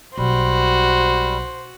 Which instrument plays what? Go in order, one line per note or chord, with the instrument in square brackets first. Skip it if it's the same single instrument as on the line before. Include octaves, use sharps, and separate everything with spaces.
[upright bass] B1 [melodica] G3 [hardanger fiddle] F#4 [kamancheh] C5